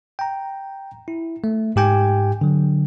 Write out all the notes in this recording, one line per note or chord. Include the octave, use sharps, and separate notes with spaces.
G5 A#5
E4
A3
G#2 G4 G5 G#5
D3 F#3